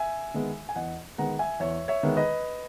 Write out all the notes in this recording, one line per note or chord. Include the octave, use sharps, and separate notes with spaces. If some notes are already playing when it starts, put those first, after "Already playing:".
Already playing: E5 G#5
D#3 G#3 B3
G#5
E2 D#5 F#5
D#3 G#3 B3 F#5 A#5
E5 G#5
E2 C#5 E5
C#5 E5
D#3 G#3 B3
B4 D#5